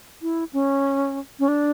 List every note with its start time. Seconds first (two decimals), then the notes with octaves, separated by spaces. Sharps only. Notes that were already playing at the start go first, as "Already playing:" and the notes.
0.22 E4
0.53 C#4
1.39 C#4
1.48 D4